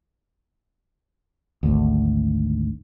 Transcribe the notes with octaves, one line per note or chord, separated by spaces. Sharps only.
G#1 D2